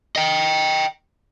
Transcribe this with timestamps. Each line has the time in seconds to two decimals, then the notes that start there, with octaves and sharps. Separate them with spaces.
0.16 D#5 G5